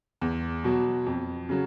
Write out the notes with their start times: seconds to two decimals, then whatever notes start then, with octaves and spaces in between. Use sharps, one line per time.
0.21 E2
0.64 B2 F#3
1.06 F2
1.49 C#3 F#3